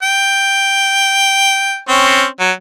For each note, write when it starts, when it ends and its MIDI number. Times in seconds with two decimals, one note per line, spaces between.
0.03 1.78 79
1.89 2.25 60
1.89 2.25 61
2.40 2.51 54